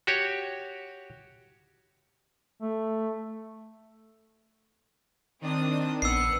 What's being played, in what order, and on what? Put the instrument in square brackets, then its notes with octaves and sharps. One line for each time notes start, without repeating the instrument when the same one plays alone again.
[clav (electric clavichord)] F#4 G4 C#5
[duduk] A3
[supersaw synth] D#3 D4 [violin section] C4 D#6
[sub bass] A#1 [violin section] B3 C#7 [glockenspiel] E6 C7